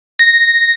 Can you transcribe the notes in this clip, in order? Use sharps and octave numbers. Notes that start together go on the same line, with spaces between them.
A#6